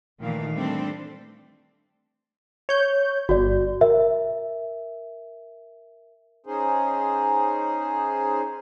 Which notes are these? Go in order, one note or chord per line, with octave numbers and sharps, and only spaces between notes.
A#2 D#3 E3 A3 F5
G3 A3 C4 D4 A4 C5
C#5 G6
G1 F#4 D5
A#4 E5
C#4 D#4 G#4 C5